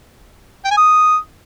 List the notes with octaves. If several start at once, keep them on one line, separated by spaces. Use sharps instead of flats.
G5
G#5
D#6